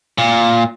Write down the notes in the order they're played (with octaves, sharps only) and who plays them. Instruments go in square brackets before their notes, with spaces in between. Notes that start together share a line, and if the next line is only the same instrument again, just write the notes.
[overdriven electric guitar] A#2